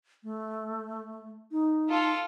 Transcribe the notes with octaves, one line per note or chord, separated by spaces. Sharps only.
A3
D#4
F4 A4